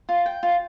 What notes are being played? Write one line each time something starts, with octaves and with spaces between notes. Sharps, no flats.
F4
G5
F4